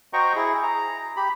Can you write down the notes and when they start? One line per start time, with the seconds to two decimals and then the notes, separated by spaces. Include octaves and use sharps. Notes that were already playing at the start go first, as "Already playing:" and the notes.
0.13 F#4 C5 D#5 G5 A#5 C#6
0.35 E4 G#4
0.63 A#5
1.17 G4 B5